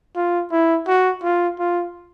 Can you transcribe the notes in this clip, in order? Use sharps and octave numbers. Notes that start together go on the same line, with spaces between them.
F4
E4
F#4
F4
F4